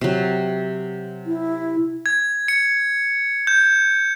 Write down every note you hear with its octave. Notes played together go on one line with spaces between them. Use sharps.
C3 F#3
E4
G#6
C#7
G6